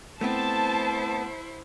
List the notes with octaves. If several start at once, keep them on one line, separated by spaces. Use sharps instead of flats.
A3 B3 C4 E4 C5 A5